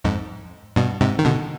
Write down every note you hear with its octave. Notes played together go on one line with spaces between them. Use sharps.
F2 G#2
G2 B2
G#2 C3
D#3
B2 D3